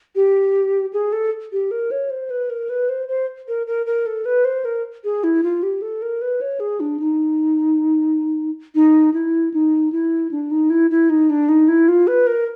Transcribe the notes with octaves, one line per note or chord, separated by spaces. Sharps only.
G4
G#4
A4
G4
A#4
C#5
C5
B4
A#4
B4
C5
C5
A#4
A#4
A#4
A4
B4
C5
A#4
G#4
E4
F4
G4
A4
A#4
B4
C#5
G#4
D4
D#4
D#4
E4
D#4
E4
D4
D#4
E4
E4
D#4
D4
D#4
E4
F4
B4
A#4